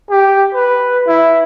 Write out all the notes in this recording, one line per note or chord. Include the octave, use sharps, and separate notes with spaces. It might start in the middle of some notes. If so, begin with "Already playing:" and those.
G4
B4
E4